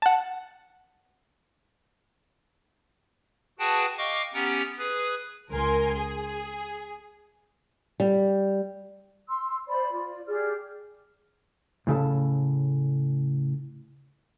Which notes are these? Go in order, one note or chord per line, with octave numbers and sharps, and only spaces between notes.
F#5 A5
F#4 G#4 B4 F#5 G5 A5
D#5 F5 G5 C#6 D6
B3 C#4 G4 F#5 G5 A#5
G#4 B4
C#2 A#4 G#5 C6
G#4
G3
C6 E6
C5 D5 B5
F4 D5
G4 G#4 D5 F6
A2 C#3 A4 A5